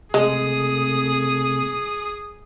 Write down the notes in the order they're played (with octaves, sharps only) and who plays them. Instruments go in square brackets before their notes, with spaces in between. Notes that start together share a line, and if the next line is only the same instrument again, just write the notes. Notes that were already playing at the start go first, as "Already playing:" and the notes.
[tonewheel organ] C3 A3 [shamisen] G#3 [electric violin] G#4 D#6